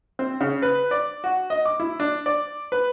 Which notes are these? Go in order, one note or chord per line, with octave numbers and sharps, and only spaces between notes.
C4
C#3
B4
D5
F#4
D#5
D6
E4
D4
D5
B4